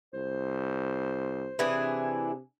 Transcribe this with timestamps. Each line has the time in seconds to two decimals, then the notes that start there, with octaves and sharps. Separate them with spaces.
0.14 C2 C5
1.59 C3 E3 D4 G#4